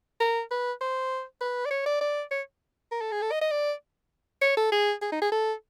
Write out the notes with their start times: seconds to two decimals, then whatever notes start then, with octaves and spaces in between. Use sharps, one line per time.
0.20 A#4
0.51 B4
0.81 C5
1.41 B4
1.65 D5
1.71 C#5
1.86 D5
2.01 D5
2.31 C#5
2.91 A#4
3.01 A4
3.11 G#4
3.22 A4
3.31 D#5
3.41 D#5
3.51 D5
4.41 C#5
4.57 A4
4.72 G#4
5.02 G#4
5.12 D#4
5.22 G#4
5.32 A4